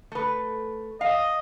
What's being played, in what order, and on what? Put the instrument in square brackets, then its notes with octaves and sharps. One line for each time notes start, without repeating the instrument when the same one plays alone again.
[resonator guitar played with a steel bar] A3 B4
[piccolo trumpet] D#5 [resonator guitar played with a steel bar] F5